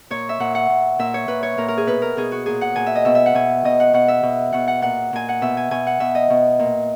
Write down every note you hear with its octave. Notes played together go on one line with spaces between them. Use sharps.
A#2 C#5
E5
A#2 F#5
F#5
A#2
A#2 E5
C#5
A#2 B4
C#5
A#2 A#4
A#4
G#4
B2 B4
A#4
B2 G#4
F#4
A#2 G#4
F#5
A#2 G#5
E5
D#5
B2 E5
E5
F#5
B2 G#5
B2 D#5
F#5
B2 F#5
E5
B2
B2 F#5
F#5
A#2 F#5
A#2 G#5
F#5
B2 E5
G#5
B2 G#5
F#5
B2 E5
D#5
B2
A#2